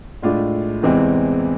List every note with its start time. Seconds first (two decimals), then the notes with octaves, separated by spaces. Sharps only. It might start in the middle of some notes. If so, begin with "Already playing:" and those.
0.22 A2 G#3 D4 F4
0.83 E2 C3 E3 G#3 C4